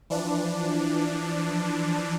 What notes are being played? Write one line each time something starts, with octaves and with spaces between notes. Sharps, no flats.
E3 F3 D4